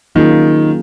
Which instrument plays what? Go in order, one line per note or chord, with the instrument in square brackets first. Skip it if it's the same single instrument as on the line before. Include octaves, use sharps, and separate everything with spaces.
[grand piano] D#3 [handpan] F#3 A#3 C#4 F4 G#4